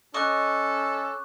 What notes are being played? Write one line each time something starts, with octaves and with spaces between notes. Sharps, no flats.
C#4 A4 D#5 C#6 D6 F#6